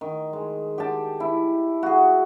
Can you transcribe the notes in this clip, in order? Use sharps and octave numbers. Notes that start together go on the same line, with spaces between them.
D#3
G#3
G4 G5 A5
E4
F#4 G#4